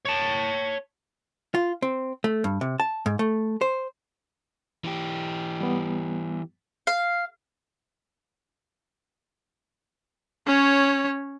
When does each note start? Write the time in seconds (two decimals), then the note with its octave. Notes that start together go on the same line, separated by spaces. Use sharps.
0.05 C#5 A5
1.55 F4
1.82 C4
2.24 A3
2.44 G2
2.61 C3
2.80 A5
3.06 G#2
3.19 A3
3.61 C5
4.84 E3 G4
5.61 G3 B3
6.87 F5
10.47 C#4 C#5